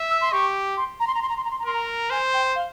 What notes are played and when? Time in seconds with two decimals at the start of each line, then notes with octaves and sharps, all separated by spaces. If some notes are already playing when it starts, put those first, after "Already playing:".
Already playing: E5
0.10 E6
0.21 C6
0.32 G4 C#6
0.77 C6
1.00 A#5
1.07 C6
1.15 A#5
1.22 C6
1.29 A#5
1.37 C6
1.44 A#5
1.51 C6
1.59 A#5
1.66 A#4 C6
1.73 A#5
2.10 C5 G#5
2.33 G5
2.56 F5